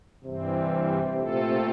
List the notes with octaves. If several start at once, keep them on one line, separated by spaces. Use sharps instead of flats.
G2 C3 E3 G3 C4
A#2 A3 C4 F4 A4